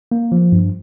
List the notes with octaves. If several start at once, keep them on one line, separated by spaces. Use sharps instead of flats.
A#3
F3
G2